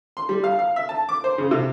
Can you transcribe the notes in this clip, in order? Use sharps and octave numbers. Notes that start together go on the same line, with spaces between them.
C6
G3
F5
F5
E5
A5
D6
C5
C#3
C3